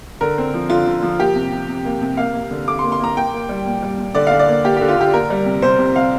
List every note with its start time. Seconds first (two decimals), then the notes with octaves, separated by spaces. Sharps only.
0.21 D3 A#4
0.38 C4
0.54 F3
0.70 D3 F4
0.87 D3
1.02 F3
1.19 A#3 G4
1.36 C3
1.52 C3
1.68 C3
1.85 A#3
2.02 C3
2.17 A#3 F5
2.34 A#3
2.51 D3
2.68 D3 D6
2.79 C6
2.84 A#3
2.92 C6
3.00 A#3 A#5
3.17 A#3 G5
3.33 A#3
3.49 G3
3.66 A#2
3.82 G3
3.98 A#2
4.15 D3 D5
4.27 D3 F5
4.39 D5
4.48 A#3
4.64 A#3 G4
4.77 D3 G4
4.89 F4
4.96 D3 G4
5.13 A#3 A#4
5.30 G3
5.46 C3
5.62 C3 C5
5.79 C3
5.95 C3 F5